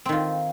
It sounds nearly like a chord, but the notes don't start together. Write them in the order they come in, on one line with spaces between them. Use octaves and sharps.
C4 D#3 F4